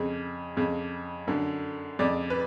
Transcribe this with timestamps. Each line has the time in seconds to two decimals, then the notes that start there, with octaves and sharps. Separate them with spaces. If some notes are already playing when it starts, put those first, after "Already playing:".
Already playing: F2 C#3
0.56 F2 C#3
1.27 F#2 D3
1.99 F2 C#3 D5
2.30 B4